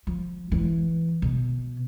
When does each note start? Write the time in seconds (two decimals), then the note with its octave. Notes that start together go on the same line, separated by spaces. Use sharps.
0.07 F3
0.52 E3
1.22 B2